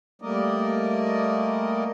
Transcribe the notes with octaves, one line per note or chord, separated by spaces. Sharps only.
G3 A3 A#3 A#4 D5 D#5